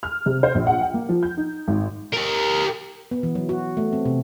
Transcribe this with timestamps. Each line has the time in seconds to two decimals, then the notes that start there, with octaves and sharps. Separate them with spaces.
0.03 F6
0.26 C3
0.43 C5
0.55 A#1
0.67 F#5
0.81 G5
0.94 A#3
1.09 F3
1.23 G6
1.37 D#4
1.68 G#1
2.13 G4 A#4
3.11 B3
3.23 E3
3.35 F#3
3.49 F#4
3.77 A3
3.93 C4
4.05 C3